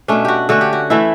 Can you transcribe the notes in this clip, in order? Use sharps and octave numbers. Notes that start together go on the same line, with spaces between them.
B2 A3 C#4 D4
F#4 G4
D3 A3 C#4 F#4
G4
F#4
E3 A3 E4